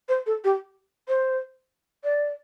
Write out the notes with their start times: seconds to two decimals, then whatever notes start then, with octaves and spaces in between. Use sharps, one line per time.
0.09 C5
0.26 A4
0.44 G4
1.08 C5
2.04 D5